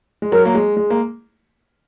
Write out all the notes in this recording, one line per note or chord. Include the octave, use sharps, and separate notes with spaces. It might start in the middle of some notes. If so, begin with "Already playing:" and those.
G#3
F#3 A#4
A#3
G#3
G#3
A#3